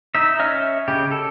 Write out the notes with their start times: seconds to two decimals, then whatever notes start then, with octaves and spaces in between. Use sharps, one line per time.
0.15 D#4 E5
0.39 C#4 D#5 E5 F6
0.88 C#3 G4
1.11 A4